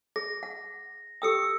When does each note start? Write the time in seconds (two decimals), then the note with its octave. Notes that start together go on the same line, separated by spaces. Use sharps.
0.16 G#4 A#6
0.43 F#5
1.22 G4 A4 G5 D#6 E6 C#7